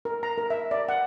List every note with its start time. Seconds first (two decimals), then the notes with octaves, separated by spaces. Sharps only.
0.05 A#4
0.23 A#5
0.38 A#4
0.50 E5
0.71 D5
0.89 F#5